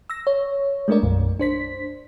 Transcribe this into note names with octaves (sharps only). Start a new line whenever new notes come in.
E6 A#6
C#5
G#3 A3 D4 A#4 D5
B1 F#2 B2
D4 C5 B6